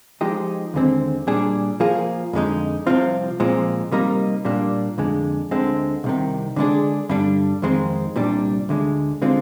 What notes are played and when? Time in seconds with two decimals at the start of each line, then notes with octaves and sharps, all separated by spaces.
0.21 F3 G#3 D#4 G4
0.74 D#2 D3 G#3 C4
1.27 A#2 G3 D4 G#4
1.80 F3 A#3 F4 G#4
2.33 F2 D3 G#3 D#4
2.87 C2 C3 F3 C4 F4
3.40 A#2 F3 G#3 C4
3.92 C3 G3 A#3 D#4 A#4
4.45 A#2 G3 A#3 D4
4.98 F2 D3 G#3
5.51 D2 D3 G#3 C4
6.04 C2 C3 D#3
6.56 D3 G#3 D4 G#4
7.09 G2 D3 G3 D4
7.62 F2 D#3 G#3 C4
8.16 C2 A#2 G3 D4
8.69 D2 D3 G#3
9.22 D3 G#3 C4 F4